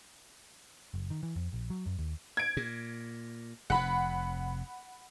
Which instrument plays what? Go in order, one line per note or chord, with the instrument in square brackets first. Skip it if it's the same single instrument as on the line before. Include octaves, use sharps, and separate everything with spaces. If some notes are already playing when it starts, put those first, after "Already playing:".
[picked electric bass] F#1
D#3
E3
F2
A#1
F#3
F#2
D#2
[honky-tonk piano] G#6 D7
[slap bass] A#2
[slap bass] F1 C3 [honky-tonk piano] F#5 B5